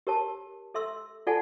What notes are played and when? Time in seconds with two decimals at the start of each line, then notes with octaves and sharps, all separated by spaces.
0.07 G4 A#4 C#5 A5
0.74 A4 E5 C6 E6
1.27 F4 A4 D5 F#5 G#5 A5